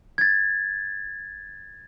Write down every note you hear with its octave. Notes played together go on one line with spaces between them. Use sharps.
G#6 A6